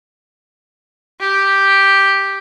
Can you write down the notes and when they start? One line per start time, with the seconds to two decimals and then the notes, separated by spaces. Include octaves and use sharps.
1.20 G4